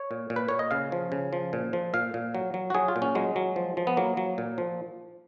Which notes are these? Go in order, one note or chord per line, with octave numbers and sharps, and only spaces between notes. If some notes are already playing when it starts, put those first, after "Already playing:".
Already playing: C#5
A#2
A#2
B4
A#2 C#5
D#5
C#3 F5
F3
C#3
F3
A#2
F3
A#2 F5
A#2
F#3
F#3
F#4
F#3 G#4
F4
A#2
C#4
F#3 G#3
F#3
F3
F3
B3
F#3 A#3
F#3
A#2
F3